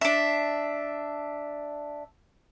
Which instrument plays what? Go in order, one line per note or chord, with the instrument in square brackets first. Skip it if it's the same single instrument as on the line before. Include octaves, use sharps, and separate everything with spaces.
[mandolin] D4 E5